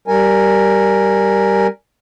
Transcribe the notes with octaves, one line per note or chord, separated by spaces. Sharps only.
G3 A#4 G#5